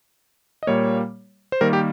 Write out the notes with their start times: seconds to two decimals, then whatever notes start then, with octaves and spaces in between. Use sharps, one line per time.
0.63 D#5
0.67 A#2 G3 A#3 C#5
1.52 C5
1.61 D#3 G3 A#3 A#4
1.73 G4